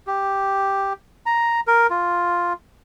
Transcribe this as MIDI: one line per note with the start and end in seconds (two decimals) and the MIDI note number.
0.07 0.93 67
1.26 1.60 82
1.67 1.87 70
1.90 2.53 65